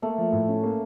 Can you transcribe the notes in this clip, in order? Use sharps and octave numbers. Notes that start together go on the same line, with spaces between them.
A3 A#3
F3
A2
C#4
A#3